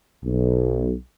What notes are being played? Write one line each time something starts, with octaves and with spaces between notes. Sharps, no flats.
B1